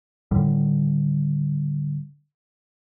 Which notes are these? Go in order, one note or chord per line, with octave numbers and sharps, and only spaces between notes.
A2 D3 D#3 G3